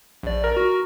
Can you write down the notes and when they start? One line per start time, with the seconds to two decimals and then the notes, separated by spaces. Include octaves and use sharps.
0.23 A#1 D5
0.44 A#4
0.57 F#4